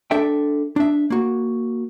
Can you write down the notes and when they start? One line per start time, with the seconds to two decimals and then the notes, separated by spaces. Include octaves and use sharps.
0.11 D4 A4 E5 G5
0.76 D4 E5
1.10 A#3 F#4